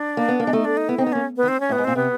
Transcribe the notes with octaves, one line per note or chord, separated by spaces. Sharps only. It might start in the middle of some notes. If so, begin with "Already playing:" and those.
Already playing: D4
A#3
B3
A#3
G#3
A3 D#4
D4
D#4
B3 E4
C4 D#4
B3
A#3 C#4
B3
D#3
C4
C#4
A2
B3
G#2
A#2 C4
C3 B3